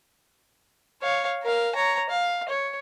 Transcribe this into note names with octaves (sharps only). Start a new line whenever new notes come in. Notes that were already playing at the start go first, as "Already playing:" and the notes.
C#5 F5
A#4 F5
C#5 A#5
F5
C#5